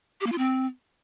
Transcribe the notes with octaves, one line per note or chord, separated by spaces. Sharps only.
G4
A#3
F4
C4